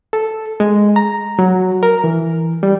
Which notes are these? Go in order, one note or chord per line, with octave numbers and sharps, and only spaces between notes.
A4
G#3
A#5
F#3
A#4
E3
G3